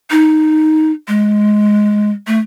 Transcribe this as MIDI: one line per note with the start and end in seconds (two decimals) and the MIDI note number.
0.11 0.91 63
1.08 2.11 56
2.27 2.39 57